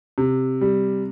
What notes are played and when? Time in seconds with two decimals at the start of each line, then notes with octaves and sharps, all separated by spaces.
0.18 C3
0.61 G3